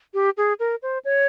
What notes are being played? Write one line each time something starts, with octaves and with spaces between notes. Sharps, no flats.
G4
G#4
A#4
C5
C#5